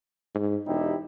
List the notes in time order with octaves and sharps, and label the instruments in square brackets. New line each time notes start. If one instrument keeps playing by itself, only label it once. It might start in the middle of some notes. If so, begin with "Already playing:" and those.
[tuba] G#2
[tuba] E1 [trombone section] D#4 E4 G4